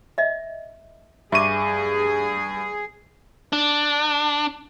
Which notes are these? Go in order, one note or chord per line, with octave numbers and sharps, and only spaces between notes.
D#5 E5
G2 G#4 E5 C#6 D6 D#7
D4